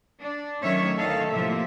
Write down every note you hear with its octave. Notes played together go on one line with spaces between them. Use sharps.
D4
D#3 F#3 A3 C#4 C#5 E5
D2 D#3 D#4 A4 F5
A2 C3 F3 A#3 E5